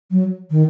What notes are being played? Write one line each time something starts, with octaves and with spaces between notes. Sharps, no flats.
F#3
D#3